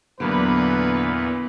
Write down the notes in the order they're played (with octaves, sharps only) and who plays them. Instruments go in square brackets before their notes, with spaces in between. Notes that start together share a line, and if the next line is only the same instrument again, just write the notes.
[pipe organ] E2 A#2 [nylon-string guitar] D3 F#3 A#3 [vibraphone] B3 [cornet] B4